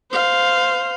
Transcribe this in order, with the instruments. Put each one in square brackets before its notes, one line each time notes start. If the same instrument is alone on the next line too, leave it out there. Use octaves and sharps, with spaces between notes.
[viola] C5 F5